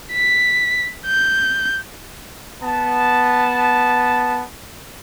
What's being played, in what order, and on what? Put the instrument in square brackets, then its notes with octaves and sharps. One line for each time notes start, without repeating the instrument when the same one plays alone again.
[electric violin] B6
G6
[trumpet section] B3 A5